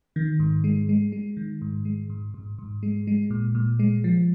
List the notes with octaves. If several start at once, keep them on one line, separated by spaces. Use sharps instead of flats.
D#3
G#2
G#3
G#3
G#3
D#3
G#2
G#3
G#2
G#2
G#2
G#3
G#3
A#2
A#2
G#3
F3